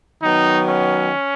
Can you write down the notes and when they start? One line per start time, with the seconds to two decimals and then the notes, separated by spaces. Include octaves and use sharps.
0.21 D#3 F#3 B3 D#4
0.67 C#4